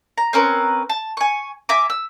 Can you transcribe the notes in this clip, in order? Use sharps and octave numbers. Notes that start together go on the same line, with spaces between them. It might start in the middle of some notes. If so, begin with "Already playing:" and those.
A#5
C4 C#4 A#4 B4
A5
G#5 C#6
E5 G#5 A#5 D6
E6